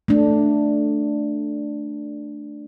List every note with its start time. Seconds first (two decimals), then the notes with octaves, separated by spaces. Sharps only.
0.08 A3 D4